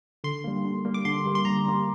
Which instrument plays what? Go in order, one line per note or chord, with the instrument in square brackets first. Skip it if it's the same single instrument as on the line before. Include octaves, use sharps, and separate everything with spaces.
[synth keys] D3 C6
G3 A#3
D3
G3 A#3
D6
D3 C6
G3 A#3
C6
D3 A#5
G3 A#3